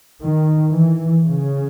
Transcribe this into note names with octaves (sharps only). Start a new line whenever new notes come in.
D#3
E3
C#3